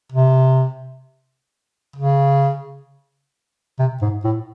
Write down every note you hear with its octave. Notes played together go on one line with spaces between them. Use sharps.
C3
C#3
C3
G#2
A2